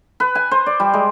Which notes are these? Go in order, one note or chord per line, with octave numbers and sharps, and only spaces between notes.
B4
G#5
C5
D5
G3
G#3